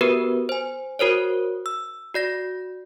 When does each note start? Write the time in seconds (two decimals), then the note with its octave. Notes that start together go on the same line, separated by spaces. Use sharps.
0.01 B3 F#4 G4 A#4 B4
0.49 C5 G#5
0.99 F#4 A#4 C5 C#5
1.66 E6
2.14 F#4 D5 A#6